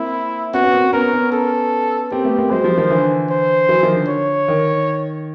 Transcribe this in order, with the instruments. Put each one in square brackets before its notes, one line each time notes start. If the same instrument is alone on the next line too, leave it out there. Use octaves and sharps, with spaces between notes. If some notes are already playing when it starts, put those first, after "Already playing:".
Already playing: [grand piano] A#3 C4 [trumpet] E4
[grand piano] B3 C#4 [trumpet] F#4
[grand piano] B3 C#4
A#3 C4
[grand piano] B3 C#4 [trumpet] A#4
[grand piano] B3 C#4
[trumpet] A4
[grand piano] A#3 C4 [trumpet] G4
[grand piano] A3 B3
A#3 C4
[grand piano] F#3 G#3 [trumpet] C5
[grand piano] F3 G3
D#3 F3
D3 E3
[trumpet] C5
[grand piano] E3 F#3
D#3 F3
D3
[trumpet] C#5
[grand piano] D#3